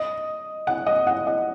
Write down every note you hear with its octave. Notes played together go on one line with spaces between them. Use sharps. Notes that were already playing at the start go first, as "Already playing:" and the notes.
Already playing: D#5
F#5
D#5
F#5
D#5